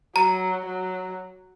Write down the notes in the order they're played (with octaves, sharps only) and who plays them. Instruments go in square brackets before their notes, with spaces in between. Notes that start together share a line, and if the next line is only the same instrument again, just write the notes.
[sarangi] F#3 [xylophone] A#5
[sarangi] F#3